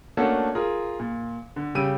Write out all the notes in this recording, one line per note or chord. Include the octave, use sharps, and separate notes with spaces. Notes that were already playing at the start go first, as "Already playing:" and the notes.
A3 A#3 C#4 D4 F#4 A4
F4 G#4 A#4
A#2
D3
C#3 G3 G4 E6 D7 D#7